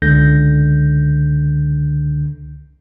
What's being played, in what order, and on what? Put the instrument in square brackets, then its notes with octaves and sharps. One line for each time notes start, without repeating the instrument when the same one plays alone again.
[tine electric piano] C#2 D3 G6 A#6